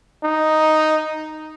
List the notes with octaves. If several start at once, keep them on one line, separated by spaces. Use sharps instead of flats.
D#4